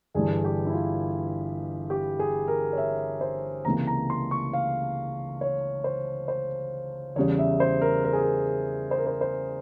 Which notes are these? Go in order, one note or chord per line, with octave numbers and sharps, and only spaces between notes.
G1 G2 E3 G#4
G4
E4
F4
G4
G#4
A#4
C#5
E5
C5
C#2 C3 E3 A#3 A#5
A#5
C6
C#6
F5
C#5
C5
C5
E2 C#3 G3 C#5
E5
C5
A#4
A#4
G#4
A#4
C5
A#4
C5
C5